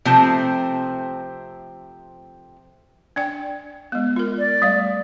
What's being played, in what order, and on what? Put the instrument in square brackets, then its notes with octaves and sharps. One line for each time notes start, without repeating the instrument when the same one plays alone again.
[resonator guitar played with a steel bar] C3 F3 A3 C4
[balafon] D4 D5 G5
G#3 B3
F4 A#4
[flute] D5
[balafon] G3 A3 F5